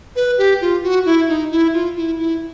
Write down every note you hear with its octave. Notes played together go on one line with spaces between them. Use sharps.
B4
G4
F4
F#4
E4
D#4
E4
F4
E4
E4